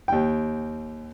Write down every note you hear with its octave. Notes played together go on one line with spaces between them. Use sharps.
D#2 G5